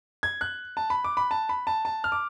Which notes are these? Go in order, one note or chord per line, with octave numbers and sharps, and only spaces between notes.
G#6
F#6
A5
B5
D6
B5
A5
B5
A5
A5
F6
D6